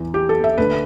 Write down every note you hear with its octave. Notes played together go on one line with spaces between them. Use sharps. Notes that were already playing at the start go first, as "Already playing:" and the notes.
Already playing: E2 E3
G4
A4
E5
D2 D3 B4